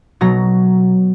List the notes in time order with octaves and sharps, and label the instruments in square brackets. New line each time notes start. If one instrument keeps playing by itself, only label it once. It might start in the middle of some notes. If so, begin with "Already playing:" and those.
[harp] B2 F#3 A#5